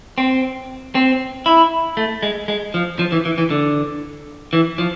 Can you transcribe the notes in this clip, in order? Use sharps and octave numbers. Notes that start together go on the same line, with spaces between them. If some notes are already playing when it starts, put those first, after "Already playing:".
C4
C4
E4
A3
G#3
G#3
F3
F3
E3
E3
E3
D3
E3
F3